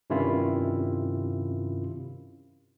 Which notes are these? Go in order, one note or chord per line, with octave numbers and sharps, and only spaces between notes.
G2 C3 D#3 C#4 E4 F4